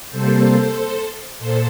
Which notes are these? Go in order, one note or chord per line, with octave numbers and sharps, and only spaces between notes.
C3 G3 A#3 A4 C5
A#2 A4 C5